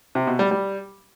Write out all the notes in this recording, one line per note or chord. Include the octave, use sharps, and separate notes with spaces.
C3
B2
G3
G3